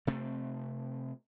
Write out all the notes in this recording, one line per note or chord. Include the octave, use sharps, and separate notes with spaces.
C3 A3 C4